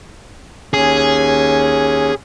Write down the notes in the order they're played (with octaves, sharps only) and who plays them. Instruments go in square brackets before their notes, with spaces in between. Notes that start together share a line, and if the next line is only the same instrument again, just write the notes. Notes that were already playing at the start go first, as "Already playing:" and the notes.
[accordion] D#2 C#4 [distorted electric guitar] G#4